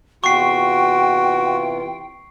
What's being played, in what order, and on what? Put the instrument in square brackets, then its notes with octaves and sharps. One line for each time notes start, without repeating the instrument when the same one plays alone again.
[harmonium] E2 C3 F4 [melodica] F#4 [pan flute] G5 [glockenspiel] C#6 C7